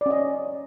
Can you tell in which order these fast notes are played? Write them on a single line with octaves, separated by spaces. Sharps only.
D5 C#4 D#5